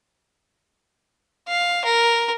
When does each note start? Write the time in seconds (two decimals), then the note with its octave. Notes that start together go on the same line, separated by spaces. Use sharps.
1.48 F5
1.85 A#4